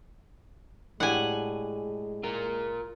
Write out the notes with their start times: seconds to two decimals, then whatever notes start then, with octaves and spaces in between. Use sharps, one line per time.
1.00 A2 G#3 D4 G4 F#5 G#5
2.23 F4 A#4